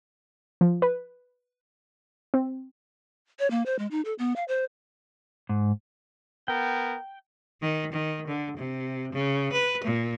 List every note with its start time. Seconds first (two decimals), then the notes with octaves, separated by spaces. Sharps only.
0.61 F3
0.82 B4
2.34 C4
3.39 C#5
3.51 A#3
3.66 C5
3.79 G#3
3.91 D#4
4.05 A4
4.19 B3
4.36 F5
4.48 C5
5.49 G#2
6.48 B3 A#4 G5
7.61 D#3
7.92 D#3
8.27 D3
8.57 C3
9.13 C#3
9.53 B4
9.84 A#2